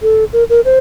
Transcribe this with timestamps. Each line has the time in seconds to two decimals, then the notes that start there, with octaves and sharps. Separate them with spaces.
0.02 A4
0.33 A#4
0.50 A#4
0.65 C5